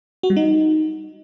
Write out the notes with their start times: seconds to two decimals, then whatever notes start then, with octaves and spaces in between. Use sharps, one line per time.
0.23 F#4
0.30 G3
0.36 D#4